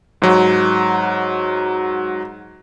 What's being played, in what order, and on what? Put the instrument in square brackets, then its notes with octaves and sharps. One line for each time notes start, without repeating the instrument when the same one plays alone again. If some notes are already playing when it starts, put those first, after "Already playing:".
[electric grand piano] G#2 F#3